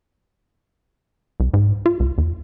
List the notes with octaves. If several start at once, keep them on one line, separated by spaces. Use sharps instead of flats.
C2
G#2
F4
C#2
E2